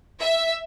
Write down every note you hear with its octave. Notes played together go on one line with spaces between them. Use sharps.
E5